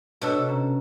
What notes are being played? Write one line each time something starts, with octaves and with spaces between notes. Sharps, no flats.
B2 D4 A4 C#5
C3
C#4 A#5